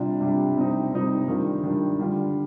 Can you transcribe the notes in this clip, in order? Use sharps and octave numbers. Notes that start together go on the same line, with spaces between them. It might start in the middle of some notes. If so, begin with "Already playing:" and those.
Already playing: C3 G3 D4 F4
C3 G3 D4 F4
C3 G3 C4 D#4
C3 G3 C4 D#4
D#3 G3 D4 F4
D#3 G3 D4 F4
D3 G3 D4 F4